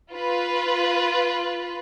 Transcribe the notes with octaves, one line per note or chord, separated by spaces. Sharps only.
F4 B4